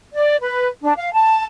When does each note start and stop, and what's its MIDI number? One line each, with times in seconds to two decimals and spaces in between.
0.14 0.36 74
0.42 0.67 71
0.82 0.92 62
0.97 1.12 77
1.13 1.44 81